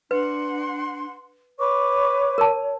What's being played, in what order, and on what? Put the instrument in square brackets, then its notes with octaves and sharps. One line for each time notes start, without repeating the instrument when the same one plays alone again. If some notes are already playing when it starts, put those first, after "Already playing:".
[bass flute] D4 [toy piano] B4 [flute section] F#5 C6
[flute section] B4 C#6 D6 [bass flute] C#5
[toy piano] A#4 A5